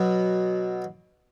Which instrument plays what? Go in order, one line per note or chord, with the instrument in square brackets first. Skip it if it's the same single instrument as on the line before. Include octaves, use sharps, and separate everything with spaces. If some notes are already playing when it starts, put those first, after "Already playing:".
Already playing: [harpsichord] B2 F#3 B3